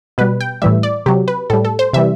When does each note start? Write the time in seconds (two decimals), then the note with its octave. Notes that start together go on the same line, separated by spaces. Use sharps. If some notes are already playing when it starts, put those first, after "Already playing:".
0.18 B2 G3 B4
0.41 G5
0.62 A2 E3 G3 E5
0.83 D5
1.06 C3 F#3 G4
1.28 B4
1.50 A2 G3 A4
1.65 A4
1.79 C5
1.93 C3 E3 G3 E5